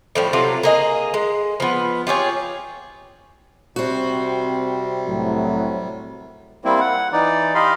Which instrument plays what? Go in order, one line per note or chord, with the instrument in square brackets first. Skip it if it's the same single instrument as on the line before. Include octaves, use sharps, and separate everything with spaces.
[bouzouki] A2 F3 G3
C3 F#3 F4 A4
A#3 G#4 D#5
G#3
F3 B3
F4 G4 G#4 C#5
[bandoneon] C3 G3 [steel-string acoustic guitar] C4 F#4
[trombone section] C2 A2 F#3
[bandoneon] G3 A#3 C4 E4
F#5
E3 D#4 D5
G4 D#5 F5 B5 C6